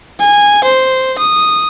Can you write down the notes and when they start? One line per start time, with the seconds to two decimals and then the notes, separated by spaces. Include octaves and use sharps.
0.20 G#5
0.64 C5
1.18 D#6